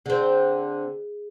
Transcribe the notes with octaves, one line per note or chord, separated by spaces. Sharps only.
D3 C4 G#4